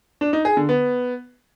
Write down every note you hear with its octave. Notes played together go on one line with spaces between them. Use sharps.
D4
D#4
G#4
D3
B3